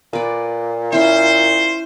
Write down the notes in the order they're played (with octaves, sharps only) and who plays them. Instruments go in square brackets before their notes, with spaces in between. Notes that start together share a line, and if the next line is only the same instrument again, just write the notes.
[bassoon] A#2 [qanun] B4 D5
[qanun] C#4 E4 [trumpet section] C5